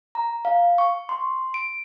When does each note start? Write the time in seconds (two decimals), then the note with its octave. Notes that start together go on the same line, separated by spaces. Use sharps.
0.15 A#5
0.45 F5
0.78 C#6
1.09 C6
1.54 D7